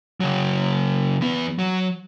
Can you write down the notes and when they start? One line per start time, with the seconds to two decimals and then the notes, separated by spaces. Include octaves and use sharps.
0.20 C#3 F#3
1.21 E2 B3
1.59 F#3